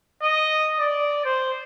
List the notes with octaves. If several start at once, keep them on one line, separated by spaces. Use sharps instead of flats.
D#5
D5
C5